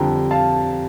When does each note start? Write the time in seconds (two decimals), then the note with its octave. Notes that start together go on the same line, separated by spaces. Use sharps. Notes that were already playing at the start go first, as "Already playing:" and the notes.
Already playing: F2 D3 G3 G5 A#5
0.31 F5 A5